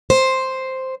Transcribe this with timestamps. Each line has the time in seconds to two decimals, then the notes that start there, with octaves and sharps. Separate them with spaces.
0.10 C5